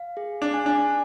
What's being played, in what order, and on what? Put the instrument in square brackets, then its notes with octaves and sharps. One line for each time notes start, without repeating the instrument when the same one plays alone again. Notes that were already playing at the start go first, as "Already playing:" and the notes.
Already playing: [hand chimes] F5
G#4
[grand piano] D4
[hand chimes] G#5
[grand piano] D4